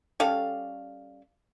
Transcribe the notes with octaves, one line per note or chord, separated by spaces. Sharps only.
G3 C#4 A4 F5